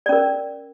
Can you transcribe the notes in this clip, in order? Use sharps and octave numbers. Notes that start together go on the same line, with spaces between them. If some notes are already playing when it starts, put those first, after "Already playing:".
C#4 A#4 D5